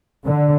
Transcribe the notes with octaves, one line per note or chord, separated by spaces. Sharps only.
D3